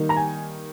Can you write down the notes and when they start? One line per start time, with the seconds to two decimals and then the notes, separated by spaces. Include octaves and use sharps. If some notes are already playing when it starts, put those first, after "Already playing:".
Already playing: D#3 G3 A#3 D#4
0.09 A#5
0.16 G#5